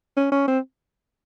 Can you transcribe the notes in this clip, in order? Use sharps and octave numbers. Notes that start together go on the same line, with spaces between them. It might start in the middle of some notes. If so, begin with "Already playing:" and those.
C#4
C#4
C4